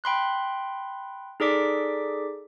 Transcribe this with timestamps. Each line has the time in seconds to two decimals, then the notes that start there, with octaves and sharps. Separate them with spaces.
0.04 G5 B5 C6 F#6
1.40 D#4 G#4 A4 D5 D6 B6